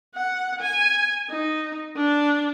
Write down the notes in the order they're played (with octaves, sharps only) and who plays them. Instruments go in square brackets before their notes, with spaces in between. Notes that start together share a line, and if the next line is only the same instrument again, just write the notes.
[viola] F#5
G#5
D#4
D4